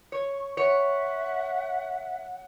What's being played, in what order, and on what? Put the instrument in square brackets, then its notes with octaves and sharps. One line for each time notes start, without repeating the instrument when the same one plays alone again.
[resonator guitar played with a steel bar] C#5 [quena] C#6
[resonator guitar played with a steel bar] C#5 [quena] E5 [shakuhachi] F#5